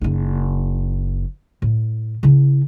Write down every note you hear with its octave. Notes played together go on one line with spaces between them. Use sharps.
F#1 D#4
A2
C#3 E4